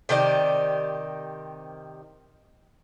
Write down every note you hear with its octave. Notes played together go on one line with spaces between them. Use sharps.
C3 D#3 G4 D5